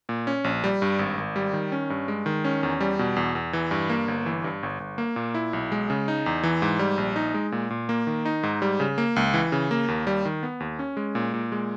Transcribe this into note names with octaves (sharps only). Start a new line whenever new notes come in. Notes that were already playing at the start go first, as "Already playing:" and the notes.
A#2
C#4
A#1
G3
G2
G#1
G#1
G3
D#3
C#4
G2
G#3
D#3
C#4
E2
G3
B2
E2
E2
E3
G2
A#3
G1
E3
G2
G1
G1
A#3
A#2
E4
B1
G#3
C#3
D#4
E2
E3
G#2
G3
A#1
D#4
G#3
A#2
A#2
A#3
D#3
D#4
G#2
G3
C#3
A#3
C#2
E3
C#3
A#3
D#2
G3
D#3
B3
D#2
C#4
G#3
A#2
A#2
G#3